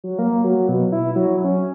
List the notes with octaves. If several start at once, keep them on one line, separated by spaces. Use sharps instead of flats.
F#3
A#3
F#3
B2
E4
F#3
C#4